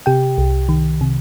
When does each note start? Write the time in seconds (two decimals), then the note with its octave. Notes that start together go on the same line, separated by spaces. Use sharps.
0.06 C3 G4 G5
0.38 C2
0.69 D#3
1.01 C3